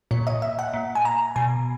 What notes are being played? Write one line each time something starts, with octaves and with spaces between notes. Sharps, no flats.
A#2 C#5
D#5
E5
F#5
A#2
G#5
A#5
B2 G#5